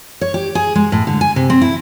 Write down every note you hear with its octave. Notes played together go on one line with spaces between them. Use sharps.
C#5
G4
G#4
G#3
A2
D3
G#5
C3
C4
E4